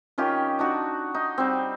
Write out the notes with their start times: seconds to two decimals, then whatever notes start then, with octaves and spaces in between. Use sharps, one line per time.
0.18 D#3 C#4 F4 G4
0.59 D4 D#4 F#4
1.15 D#4
1.38 G3 C4